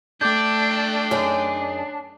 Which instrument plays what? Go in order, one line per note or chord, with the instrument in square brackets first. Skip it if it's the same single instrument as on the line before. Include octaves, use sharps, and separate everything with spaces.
[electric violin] A3 G5 [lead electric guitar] D4 [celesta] D6 G6
[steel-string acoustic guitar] F#2 D#4 G#4 [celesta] C#5